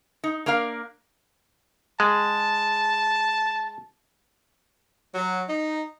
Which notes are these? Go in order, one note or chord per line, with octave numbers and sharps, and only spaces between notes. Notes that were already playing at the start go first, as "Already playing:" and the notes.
D#4
A#3 D4 A#4 F5
G#3 A5
F#3
D#4